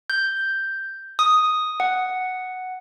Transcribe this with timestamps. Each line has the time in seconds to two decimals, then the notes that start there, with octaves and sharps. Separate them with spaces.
0.10 G6
1.19 D#6
1.80 F#5